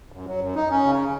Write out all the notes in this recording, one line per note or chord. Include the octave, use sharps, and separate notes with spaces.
F#2
F#3
F#2
D#4
C#4
C#3